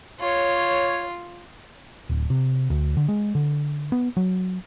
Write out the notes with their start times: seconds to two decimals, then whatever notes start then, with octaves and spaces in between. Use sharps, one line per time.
0.20 F4 C#5
2.10 D1
2.30 C3
2.70 D2
2.97 D3
3.08 G#3
3.35 D3
3.92 B3
4.17 F#3